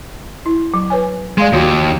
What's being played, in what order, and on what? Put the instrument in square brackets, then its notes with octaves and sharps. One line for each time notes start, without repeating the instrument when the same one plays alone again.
[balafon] E4
F#3
B4 C#5 G#5
[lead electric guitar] G#3 [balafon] D5 F5 C6
[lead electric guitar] D#2 [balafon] F4 F#4 C#5